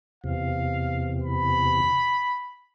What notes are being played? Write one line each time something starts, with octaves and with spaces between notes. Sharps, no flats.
E2 C3 F5
B5